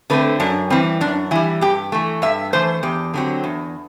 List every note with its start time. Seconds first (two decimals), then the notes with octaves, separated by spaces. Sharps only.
0.10 D3 A3 C4 B4
0.40 F#2 D4
0.70 E3 G3 C4
1.01 F#2 D4
1.31 E3 G3 E4
1.61 G2 G4
1.92 E3 A3
2.22 G2 E5
2.53 E3 A3 C5
2.83 E2 G4
3.14 D3 F#3 A3 C4
3.44 E2